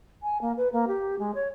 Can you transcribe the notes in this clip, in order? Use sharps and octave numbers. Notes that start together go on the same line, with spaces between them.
G#5
A#3
B4
A#3
G4
G#3
C#5